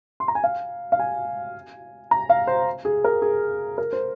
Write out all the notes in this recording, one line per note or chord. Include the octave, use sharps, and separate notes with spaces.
C6
A#5
G#5
F5
F5
G#5
A#5
F5
C5
G#4
A#4
G#4
A#4
C5